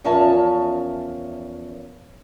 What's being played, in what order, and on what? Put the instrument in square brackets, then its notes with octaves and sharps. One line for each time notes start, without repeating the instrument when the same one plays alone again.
[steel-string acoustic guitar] E2 F3 C#4 A#4 E5 A5